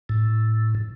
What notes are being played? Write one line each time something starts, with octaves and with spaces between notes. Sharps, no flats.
A2